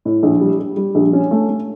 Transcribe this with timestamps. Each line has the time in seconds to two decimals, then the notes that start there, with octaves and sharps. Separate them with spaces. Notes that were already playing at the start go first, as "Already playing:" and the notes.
0.05 A2
0.23 A#1
0.41 G3
0.59 G3
0.77 G3
0.95 A#1
1.13 C#4
1.31 A3
1.49 A3